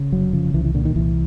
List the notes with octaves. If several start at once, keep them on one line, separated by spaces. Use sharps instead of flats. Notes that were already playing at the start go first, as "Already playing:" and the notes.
Already playing: C#3
F1 F#3
C#3 F3
C2 E3
E3
A#2 D3
D#3
C2 E3